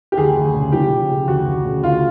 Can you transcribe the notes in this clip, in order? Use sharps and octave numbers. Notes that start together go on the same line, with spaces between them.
G4
D2 G#4
D2
C#3
F3 G4
C#3
C#3
D2 F#4
D2
C#3
D2 F4